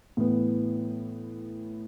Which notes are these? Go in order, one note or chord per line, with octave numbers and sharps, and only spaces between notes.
A2 E3 B3